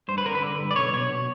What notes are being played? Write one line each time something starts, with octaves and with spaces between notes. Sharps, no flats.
G2 C5
B4
D3 A#4
B4
D3
G2
D5
B1 C#5
B2 C#5
B2